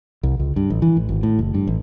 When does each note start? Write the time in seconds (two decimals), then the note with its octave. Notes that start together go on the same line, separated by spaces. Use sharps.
0.23 C2
0.39 C#2
0.56 G2
0.70 A1
0.82 E3
0.97 A1
1.09 G#1
1.23 A2
1.39 F#1
1.54 G2
1.67 A1